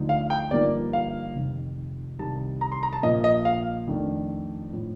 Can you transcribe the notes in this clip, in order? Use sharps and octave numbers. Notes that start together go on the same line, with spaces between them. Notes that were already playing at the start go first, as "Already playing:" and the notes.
Already playing: D2 D3 F3 A3 D#4
F5
G5
G1 G2 F3 A#3 D#4 D5
F5
F1 F2 D#3
C2 C3 D#3 A5
A#5
C6
A#5
A5
A#1 A#2 F3 A#3 D#5
D#5
F5
F2 D#3 A3 D4
A2 F3